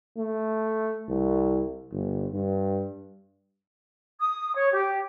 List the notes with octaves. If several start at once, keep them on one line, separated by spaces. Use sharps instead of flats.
A3
C2
G1
G2
D#6
C#5
G4